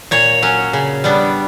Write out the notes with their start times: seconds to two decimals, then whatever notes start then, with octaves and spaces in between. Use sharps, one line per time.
0.11 A#2 C#5
0.42 F#3 C#4
0.73 C#3
1.04 G3 B3 D4